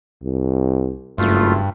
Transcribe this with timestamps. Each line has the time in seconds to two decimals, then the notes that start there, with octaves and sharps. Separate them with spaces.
0.24 C2
1.18 F#1 G2 A3 F4